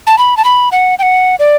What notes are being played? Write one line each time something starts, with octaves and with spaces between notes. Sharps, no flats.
A5
B5
A5
B5
F#5
G5
F#5
D5